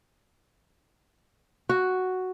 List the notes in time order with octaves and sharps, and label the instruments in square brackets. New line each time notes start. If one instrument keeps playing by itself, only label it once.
[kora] F#4